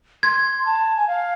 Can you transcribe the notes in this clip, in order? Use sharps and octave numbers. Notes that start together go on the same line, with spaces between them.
C6 G#6
A5
G#5
F5